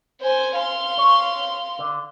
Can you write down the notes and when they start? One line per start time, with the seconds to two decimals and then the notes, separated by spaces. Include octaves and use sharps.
0.21 C5 G#5
0.54 F5 C6
0.98 C#5
1.79 D3